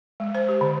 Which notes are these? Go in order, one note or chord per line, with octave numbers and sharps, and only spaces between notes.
G#3
C5
G4
D3